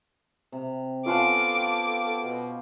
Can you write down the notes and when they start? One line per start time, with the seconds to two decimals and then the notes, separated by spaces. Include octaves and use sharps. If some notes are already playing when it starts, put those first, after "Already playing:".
0.52 C3
1.06 B3 C#4 F4 A4 F5 F#5 A5 D6
1.57 G4
2.24 B2